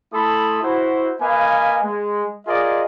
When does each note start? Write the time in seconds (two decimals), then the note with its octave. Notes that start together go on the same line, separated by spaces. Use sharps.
0.12 A3 E4 A4 B5 C6 D#6
0.62 E4 F#4 C5
1.20 A#3 B4 D#5 F5 G#5
1.83 G#3
2.47 F4 G#4 A#4 D5 D#5